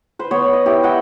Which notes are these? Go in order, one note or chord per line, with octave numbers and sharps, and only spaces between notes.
B4 C5
B3 C#5 B5
D#5
E4 G4
D#5 F#5 G5 E6